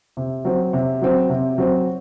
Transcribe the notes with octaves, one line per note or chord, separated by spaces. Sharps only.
C3
F#3 C4
C3
F#3 C4
C3
F#3 C4